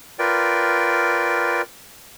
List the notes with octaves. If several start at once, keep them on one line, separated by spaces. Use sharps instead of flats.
F4 A#4 B4 D5 G5